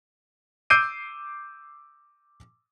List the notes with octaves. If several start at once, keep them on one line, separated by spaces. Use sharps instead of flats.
D6 E6 G6 C7 D7 D#7